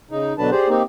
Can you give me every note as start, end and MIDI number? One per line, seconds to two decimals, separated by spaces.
0.11 0.33 49
0.11 0.33 63
0.38 0.50 47
0.38 0.50 50
0.38 0.50 54
0.38 0.50 62
0.38 0.50 71
0.38 0.50 81
0.51 0.69 67
0.51 0.69 68
0.51 0.69 72
0.51 0.69 74
0.69 0.83 58
0.69 0.83 60
0.69 0.83 63
0.69 0.83 67